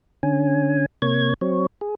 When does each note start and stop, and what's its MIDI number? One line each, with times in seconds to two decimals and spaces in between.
0.23 0.86 50
0.23 0.86 61
0.23 0.86 80
1.02 1.34 48
1.02 1.34 58
1.02 1.34 73
1.02 1.34 92
1.41 1.66 54
1.41 1.66 60
1.41 1.66 73
1.81 1.95 68